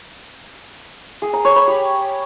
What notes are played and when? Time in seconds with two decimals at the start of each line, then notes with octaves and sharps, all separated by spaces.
1.22 G#4
1.33 A#5
1.45 C#5
1.56 B5
1.67 G4